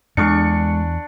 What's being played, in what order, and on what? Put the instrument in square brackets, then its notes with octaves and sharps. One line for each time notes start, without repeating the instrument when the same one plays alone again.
[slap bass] E2 [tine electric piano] G#3 C#7 [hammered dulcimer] D4 C#6